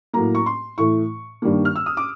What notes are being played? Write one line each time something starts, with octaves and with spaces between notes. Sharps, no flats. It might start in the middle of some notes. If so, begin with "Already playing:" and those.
A2 F#3 A#3 A#5
C#6
C6
A2 E3 A3 C#6
G2 D#3 G3 A#3
F6
E6
D#6
D6